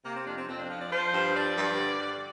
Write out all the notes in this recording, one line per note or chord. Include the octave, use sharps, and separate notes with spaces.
C3 A#3
C4
F2 D4
C4
F2 C4
D4
F3 F4
D5
F3 C5
G2
F3 D5
G2
D3
G2